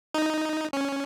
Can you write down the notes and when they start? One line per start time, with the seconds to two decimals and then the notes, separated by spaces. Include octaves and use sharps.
0.14 D#4
0.73 C#4